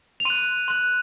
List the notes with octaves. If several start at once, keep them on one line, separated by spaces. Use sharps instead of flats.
F7
C6 F#6 D#7
C6 F#6